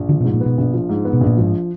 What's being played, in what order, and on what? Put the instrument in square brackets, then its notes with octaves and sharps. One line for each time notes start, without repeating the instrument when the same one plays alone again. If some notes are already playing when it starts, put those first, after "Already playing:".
Already playing: [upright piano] A#1
[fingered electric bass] D3 [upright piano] F3
[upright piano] G#2 [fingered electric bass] B2
[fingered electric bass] A#2
[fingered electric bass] B2 [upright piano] B3
[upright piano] A#1
F3
G#2
B3
[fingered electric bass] B2
[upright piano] A#1
[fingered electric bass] A#2
[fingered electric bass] G#2 [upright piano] F3